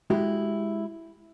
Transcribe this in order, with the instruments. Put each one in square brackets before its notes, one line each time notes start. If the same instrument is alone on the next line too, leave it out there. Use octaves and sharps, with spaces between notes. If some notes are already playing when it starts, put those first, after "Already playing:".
[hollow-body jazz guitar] G#3 E4 F#4 G4